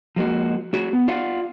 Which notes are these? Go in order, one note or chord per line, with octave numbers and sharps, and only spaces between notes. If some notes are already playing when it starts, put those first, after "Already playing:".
F3 G#3 A#3 F#4
A3 F#4 G#4
B3
F4 D5 F5 F#5